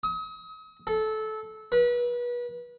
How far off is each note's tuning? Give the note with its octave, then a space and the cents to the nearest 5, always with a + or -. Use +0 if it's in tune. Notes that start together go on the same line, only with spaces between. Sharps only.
D#6 +40
A4 -20
B4 -30